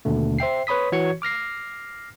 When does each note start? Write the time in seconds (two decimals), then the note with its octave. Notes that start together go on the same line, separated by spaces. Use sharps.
0.05 D#2 B2 D3 A3
0.39 C5 E5 G5 C7
0.67 B4 C#5 B5 D#6 B6
0.92 E3 F#4 C#5 C#6 G#6 C#7
1.22 D6 F6 A#6 C7